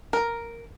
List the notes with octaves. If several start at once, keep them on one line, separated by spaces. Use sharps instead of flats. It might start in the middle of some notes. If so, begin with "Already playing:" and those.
A#4